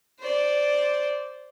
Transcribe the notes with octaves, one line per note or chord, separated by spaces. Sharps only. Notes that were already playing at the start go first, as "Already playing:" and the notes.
C5 D5